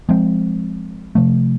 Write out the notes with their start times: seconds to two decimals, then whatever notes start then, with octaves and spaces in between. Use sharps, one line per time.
0.09 F3 G#3 C4
1.15 C3 F3 A3